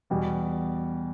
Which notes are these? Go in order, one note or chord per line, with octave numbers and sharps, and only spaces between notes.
E2 B2 G3